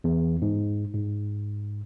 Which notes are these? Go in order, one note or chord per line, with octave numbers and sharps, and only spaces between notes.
E2
G#2
G#2